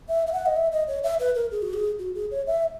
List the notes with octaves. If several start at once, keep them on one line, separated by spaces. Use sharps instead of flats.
E5
E5
F#5
D#5
E5
D#5
C#5
E5
B4
A#4
G#4
F#4
G#4
F#4
G#4
C#5
E5